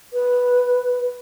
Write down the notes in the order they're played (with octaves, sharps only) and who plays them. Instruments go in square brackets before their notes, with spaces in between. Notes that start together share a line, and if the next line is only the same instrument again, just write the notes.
[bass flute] B4